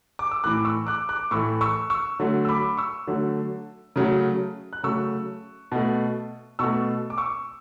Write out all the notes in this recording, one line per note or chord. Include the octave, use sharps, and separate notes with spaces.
D6
E6
A2 E3 A3 D6 F#6
C#6 E6
D6 F#6
D6 F#6
A2 E3 A3 C#6 E6
C#6 E6
C#6 E6
D3 F#3 A3
E6
B5 D6
C#6 E6
D3 F#3 A3
C#3 F#3 A3
F#6
C#3 F#3 A3 C#6 E6
B2 A3
B2 A3 C#6 E6
D6
C#6 E6